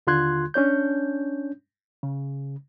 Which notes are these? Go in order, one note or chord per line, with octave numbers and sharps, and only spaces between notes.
D#2 D3 F4 C6 F#6 G#6
C#4 D4 C#5 G6
C#3